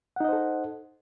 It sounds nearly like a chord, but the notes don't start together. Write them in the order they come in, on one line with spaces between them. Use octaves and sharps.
F#5 D#4 D#5 C5 A4